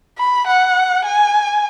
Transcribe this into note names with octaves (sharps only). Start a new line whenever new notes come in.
B5
F#5
G#5